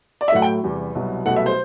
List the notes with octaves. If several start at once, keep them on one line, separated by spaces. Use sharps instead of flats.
D5
E5
A2 F#3 A3 F#5
G5
E2 C3 G3
C2 B2 F#3
C2 B2 F#3 A3 F#5
E5
C5